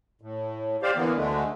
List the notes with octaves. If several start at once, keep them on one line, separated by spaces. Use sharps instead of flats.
A2
G4 C5 D5 F5
D3 E3 A#3 B3
D2 D3 G#3 A3